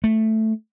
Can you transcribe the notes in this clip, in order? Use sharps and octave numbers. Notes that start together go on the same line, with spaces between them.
A3